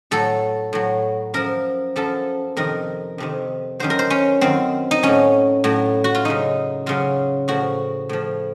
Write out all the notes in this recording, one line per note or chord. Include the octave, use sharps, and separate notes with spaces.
A2 F#3 A4
A2 F#3
F#2 F3 A#4
F#2 F3 A4
F2 C3 D#3 A#4
F2 C3 D#3
F#2 D#3 F#3 C5
A#4
C5
C#4
F#2 D#3 F#3 C4
D#4
A2 F#3 C#4
A2 F#3
F#4
F4
F#2 C#3 F#3 D#4
F#2 C#3 F#3 F4
A2 F3 F#4
A2 F3